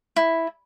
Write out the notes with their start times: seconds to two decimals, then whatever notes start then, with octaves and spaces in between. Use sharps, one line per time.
0.16 E4